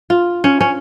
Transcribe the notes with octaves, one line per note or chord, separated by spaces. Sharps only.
F4
C#4
C#4